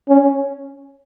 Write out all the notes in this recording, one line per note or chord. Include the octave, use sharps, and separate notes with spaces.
C#4